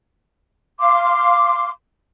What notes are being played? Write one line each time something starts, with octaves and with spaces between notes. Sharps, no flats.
F5 C6 D6